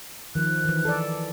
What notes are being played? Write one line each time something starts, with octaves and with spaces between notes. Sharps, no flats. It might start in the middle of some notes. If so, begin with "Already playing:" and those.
D#3 F3 F#6
D#3 E3
A4 D5